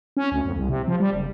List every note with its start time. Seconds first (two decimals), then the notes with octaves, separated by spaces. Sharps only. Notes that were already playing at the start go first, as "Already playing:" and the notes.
0.17 C#4
0.32 D2
0.45 F2
0.56 C2
0.69 C3
0.88 F3
1.00 G3
1.13 F#1